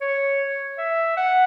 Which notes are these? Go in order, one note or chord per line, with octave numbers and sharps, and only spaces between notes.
C#5
E5
F#5